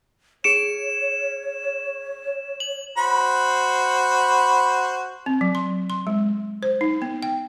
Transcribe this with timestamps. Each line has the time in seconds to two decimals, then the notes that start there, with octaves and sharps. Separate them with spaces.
0.44 G#4 C#5 C#7 D7 E7
2.60 F#7
2.98 F#4 C5 B5
5.26 C4
5.41 F#3
5.55 C6
5.90 C6
6.07 G#3
6.63 C5
6.81 D#4
7.02 B3
7.23 G5